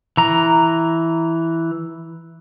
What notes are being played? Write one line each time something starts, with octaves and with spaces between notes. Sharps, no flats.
E3 A#5